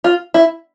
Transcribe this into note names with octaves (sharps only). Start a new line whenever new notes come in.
F4
E4